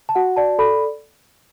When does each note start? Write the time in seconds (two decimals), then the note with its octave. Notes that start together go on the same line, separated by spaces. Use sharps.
0.09 A5
0.15 F#4 F#5
0.36 D5 A5
0.59 A4 B5